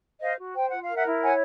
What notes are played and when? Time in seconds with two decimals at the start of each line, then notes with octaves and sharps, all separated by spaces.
0.22 C5 D#5 F5
0.38 F#4
0.54 C5 G5
0.69 F4 F#5
0.82 F5
0.89 A#4
0.95 E5 F#5
1.05 E4
1.22 C#5 F#5 G#5